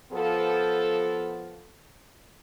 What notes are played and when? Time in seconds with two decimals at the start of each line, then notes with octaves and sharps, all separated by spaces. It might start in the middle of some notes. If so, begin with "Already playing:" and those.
0.12 F3 B3 A4